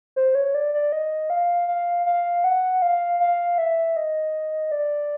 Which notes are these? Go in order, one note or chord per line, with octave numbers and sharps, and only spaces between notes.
C5
C#5
D5
D5
D#5
F5
F5
F5
F#5
F5
F5
E5
D#5
D5